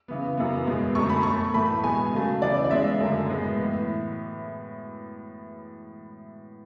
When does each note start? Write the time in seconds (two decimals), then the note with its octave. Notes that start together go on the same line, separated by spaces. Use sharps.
0.08 C#3 E3 B3
0.37 F#2 E3 B3
0.67 E2 B2 G#3 B3
0.95 F#2 D3 A3 C#6
1.09 B5
1.23 B2 A3 C#6
1.54 A2 E3 A3 B5
1.83 B2 G#3 B3 G#5
2.13 C#3 F#3 A3
2.42 C#3 E3 B3 D5
2.64 D5
2.70 C#3 G#3 B3 E5
3.00 F#2 D3 A3
3.29 A2 G#3 B3
3.58 A2 E3 B3